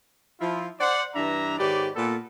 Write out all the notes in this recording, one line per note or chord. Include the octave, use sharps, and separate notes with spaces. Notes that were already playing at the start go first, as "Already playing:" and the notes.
F3 E4 F4
C5 D5 F#5
G2 E3 D4 E5 A#5
G#2 D#3 G4 B4 C#5 D5
A#2 B3 A4